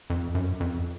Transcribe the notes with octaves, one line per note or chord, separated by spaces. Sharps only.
F2
F#2
F2